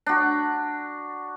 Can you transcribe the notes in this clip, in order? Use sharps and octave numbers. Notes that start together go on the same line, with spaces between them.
D4 F#4